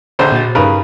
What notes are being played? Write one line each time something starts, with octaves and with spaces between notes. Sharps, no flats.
A#1 D3 C5
A#2 F#4 A6
G2 C#3 D#4 G4 A#4 B4